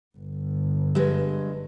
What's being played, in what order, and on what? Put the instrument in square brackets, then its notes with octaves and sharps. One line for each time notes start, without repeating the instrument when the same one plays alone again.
[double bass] G1
[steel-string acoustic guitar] G2 G#3 [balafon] G4 B4